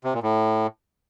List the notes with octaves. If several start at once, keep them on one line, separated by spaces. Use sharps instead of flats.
C3
A#2
A2